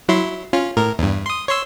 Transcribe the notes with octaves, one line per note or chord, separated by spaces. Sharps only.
F#3 E4 C6
C#4 F4
A2 A#4
E2 G2
C6 D#6
C#5 C6 E6